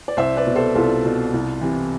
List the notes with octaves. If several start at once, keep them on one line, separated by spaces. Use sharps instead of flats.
D5
C2 C5 E5
B4 D5
B2
A4 C5
C2 F4 A4
B2
C2
C3 E3